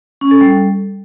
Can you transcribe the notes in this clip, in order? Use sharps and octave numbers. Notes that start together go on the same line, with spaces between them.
C#4
A4
G3